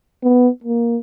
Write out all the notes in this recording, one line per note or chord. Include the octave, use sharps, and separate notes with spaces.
B3
A#3